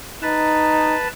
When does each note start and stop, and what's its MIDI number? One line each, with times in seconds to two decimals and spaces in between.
0.22 0.96 63
0.22 1.08 71
0.22 1.08 81